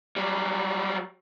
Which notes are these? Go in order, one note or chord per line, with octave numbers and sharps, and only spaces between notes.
F#3 G3